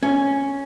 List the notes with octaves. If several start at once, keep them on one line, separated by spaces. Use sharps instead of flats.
C#4